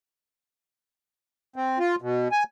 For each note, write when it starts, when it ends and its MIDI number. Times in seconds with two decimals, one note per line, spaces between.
1.56 1.79 60
1.79 1.95 65
2.02 2.28 47
2.32 2.44 80